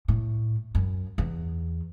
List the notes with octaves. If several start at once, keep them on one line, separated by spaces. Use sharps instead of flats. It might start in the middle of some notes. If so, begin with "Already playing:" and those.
A2
F#2
E2